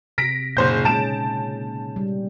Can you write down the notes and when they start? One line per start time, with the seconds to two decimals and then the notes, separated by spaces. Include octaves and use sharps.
0.18 C3 A#6 B6 D7
0.57 F#1 A#2 D#4 G#4 C5 G6
0.85 C#3 G#3 C#4 A5 D7 E7
1.96 G3